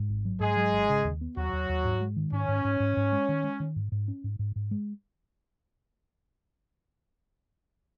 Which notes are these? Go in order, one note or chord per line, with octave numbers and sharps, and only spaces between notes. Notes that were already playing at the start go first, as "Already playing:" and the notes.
Already playing: G#2
G#1
F#3
G#2 G#3 G#4
F#3
G#1
C#3
D#2
B3
D#2 F#3 F#4
D#2
D#2
G#2
G#3
D#3
G#2 C#4
G#2
G#2
G#2
G#2
G#3
D#3
G#3
D#3
G#2
G#2
C#4
G#2
G#2
G#2
G#3